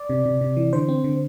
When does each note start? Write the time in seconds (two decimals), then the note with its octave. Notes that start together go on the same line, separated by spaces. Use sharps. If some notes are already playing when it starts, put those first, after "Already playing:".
Already playing: D5
0.09 C3
0.26 C3
0.41 C3
0.57 E3
0.73 D3 C5
0.88 C4
1.04 D3